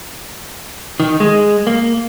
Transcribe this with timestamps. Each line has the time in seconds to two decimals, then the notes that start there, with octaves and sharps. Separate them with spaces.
1.00 D#3
1.20 G#3
1.67 A#3